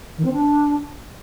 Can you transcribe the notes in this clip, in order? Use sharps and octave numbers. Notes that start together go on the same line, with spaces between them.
D#3
C4
D4